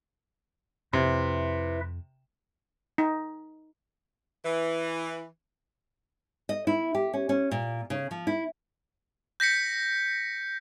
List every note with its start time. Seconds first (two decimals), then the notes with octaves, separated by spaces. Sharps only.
0.93 F2 C3 E4 B4 E5
2.98 D#4
4.45 E3
6.49 D#5
6.67 E4
6.95 G4
7.13 C#4
7.29 C#4
7.51 A#2
7.90 C#3
8.11 F3
8.27 E4
9.40 G6 A#6 B6 C#7